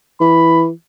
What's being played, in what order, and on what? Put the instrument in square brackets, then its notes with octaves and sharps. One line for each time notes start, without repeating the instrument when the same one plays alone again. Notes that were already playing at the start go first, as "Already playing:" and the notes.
[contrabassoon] E3 [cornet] B5